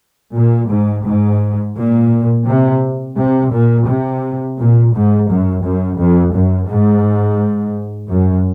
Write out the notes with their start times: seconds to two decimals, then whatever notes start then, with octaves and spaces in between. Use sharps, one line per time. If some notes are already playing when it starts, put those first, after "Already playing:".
0.37 A#2
0.72 G#2
1.06 G#2
1.77 A#2
2.48 C3
3.18 C3
3.53 A#2
3.88 C3
4.58 A#2
4.93 G#2
5.28 F#2
5.63 F#2
5.98 F2
6.34 F#2
6.68 G#2
8.09 F#2